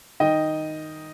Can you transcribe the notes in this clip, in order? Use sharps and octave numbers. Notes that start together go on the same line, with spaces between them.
D#3 D#5 G5